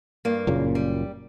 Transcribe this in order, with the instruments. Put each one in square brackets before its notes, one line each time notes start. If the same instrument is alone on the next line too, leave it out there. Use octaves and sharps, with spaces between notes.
[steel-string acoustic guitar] G2 A#3
[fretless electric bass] F#1 A#2 C#3
[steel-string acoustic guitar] G3